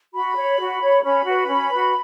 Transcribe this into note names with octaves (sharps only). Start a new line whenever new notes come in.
F#4 B5
C#5
F#4
C#5
C#4 B5
F#4 B4
C#4
F#4 B4